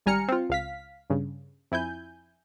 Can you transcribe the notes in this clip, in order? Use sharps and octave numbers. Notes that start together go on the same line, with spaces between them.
G#1 G3 G#5 A#5 F6 C#7
C4 F4
C#2 F5 B6
G2 C#3
F2 E4 G#5 G6